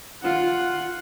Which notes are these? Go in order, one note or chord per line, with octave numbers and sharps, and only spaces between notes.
F4 F#5